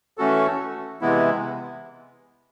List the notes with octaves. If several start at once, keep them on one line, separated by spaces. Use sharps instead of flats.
E3 A3 C#4 F#4 A4
C3 E3 G#3 B3 E4